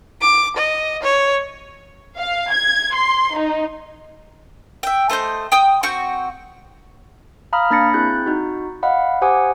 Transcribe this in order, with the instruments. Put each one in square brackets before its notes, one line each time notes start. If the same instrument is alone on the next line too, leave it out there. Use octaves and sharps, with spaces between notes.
[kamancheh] D6
D#5
C#5
[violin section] F5
G#6
C6
D#4
[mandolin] E5 G5
A3 C5 D#5 G6
G5 D#6 G6
C4 F#4 C#6 G6
[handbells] F5 A#5 B5 D#6 F6
A#3 D4 B5 A6 A#6 C#7
C4 E4 G#4 F#6 G6 A6
D#4 F#4
D#5 F5 F#5 B5
G4 C5 F#5 G#5 D6 D#6